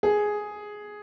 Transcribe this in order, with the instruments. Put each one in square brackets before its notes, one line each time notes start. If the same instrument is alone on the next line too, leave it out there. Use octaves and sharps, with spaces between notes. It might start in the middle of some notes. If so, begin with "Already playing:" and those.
[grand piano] G#4